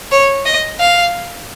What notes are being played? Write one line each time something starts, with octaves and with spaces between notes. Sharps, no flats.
C#5
D#5
F5